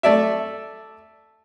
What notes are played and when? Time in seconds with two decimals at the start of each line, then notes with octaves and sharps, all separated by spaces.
0.03 A3 D5 E5